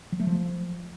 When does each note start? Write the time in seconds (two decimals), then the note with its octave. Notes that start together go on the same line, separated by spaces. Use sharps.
0.12 F#3
0.20 A3
0.27 F3